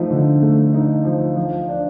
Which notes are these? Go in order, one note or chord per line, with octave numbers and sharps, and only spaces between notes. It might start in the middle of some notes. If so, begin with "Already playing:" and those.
Already playing: F3 A3 D#4
D3
A3
D#4
F3
F3
D4